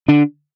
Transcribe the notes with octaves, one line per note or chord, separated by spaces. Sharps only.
D3 D4